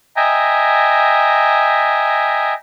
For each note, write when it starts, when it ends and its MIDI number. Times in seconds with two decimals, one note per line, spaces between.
0.17 2.54 75
0.17 2.54 76
0.17 2.54 79
0.17 2.54 80
0.17 2.54 82